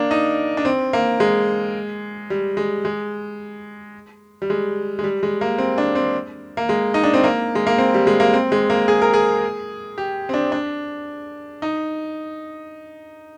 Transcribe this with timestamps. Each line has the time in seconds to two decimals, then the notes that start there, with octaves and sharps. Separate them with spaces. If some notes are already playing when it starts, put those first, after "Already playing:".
Already playing: A#3 D4
0.11 D#4
0.57 D4
0.65 C4
0.93 A#3
1.20 G#3
2.30 G3
2.57 G#3
2.85 G#3
4.42 G3
4.50 G#3
4.99 G#3
5.04 G3
5.23 G#3
5.41 A#3
5.58 C4
5.78 D4
5.95 C4
6.57 A#3
6.69 G#3
6.94 D#4
7.04 D4
7.14 C4
7.24 A#3
7.55 G#3
7.67 A#3
7.78 C4
7.94 G3
8.07 G#3
8.20 A#3
8.33 C4
8.52 G#3
8.70 A#3
8.88 G#4
9.02 A#4
9.14 G#4
9.98 G4
10.29 C4
10.34 D4
10.52 D4
11.62 D#4